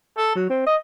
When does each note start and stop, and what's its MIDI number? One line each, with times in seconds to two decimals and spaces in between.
0.17 0.33 69
0.36 0.47 54
0.50 0.64 60
0.66 0.76 75